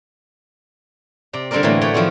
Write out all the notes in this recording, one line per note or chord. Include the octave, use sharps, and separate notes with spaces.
C3 D5 A#5
D3 G3 C4 D4 A#4 D5
A2 D3 E3 F#3 A3 A#3
F#4 B4 C#5 D5 F#5 G5
D#3 F3 F#3 A3 C4